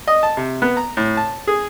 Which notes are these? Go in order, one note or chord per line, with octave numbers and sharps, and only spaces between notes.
D#5
A5
C3
B3
A#5
A2
A5
G#4